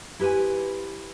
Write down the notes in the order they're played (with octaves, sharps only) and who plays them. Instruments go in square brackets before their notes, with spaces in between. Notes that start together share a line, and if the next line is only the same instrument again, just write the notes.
[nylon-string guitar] E4 G4 B4 C5 G#5